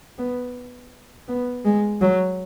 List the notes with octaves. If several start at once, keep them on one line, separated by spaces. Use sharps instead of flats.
B3
B3
G#3
F#3